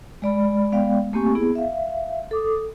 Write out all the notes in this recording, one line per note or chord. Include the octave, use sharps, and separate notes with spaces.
G#3 D5 B5
G#3 B3 D5 F5 G5
A3 A#3 C4 G4 G#5 C#6
B3 E4 G#4
E5 F5
A4 D6 D#6